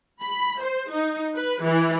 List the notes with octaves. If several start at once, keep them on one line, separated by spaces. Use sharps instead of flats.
B5
C5
D#4
B4
E3